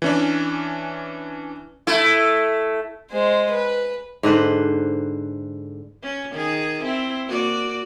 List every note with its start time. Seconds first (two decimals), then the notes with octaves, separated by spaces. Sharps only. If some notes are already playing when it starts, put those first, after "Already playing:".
0.02 E3 C#4 D4
1.87 A3 E4
3.11 G#3 C5
3.51 B4
4.23 G#2 D3 B4 C5
6.03 C#4
6.32 D#3 G#4
6.83 C4 E4
7.27 A#3 F#4 D5